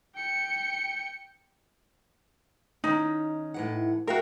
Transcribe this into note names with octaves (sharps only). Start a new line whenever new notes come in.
G5 C#7
D#3 C#4 D#4
A2 E3 F#5
F#4 A#4 E5 F5 G5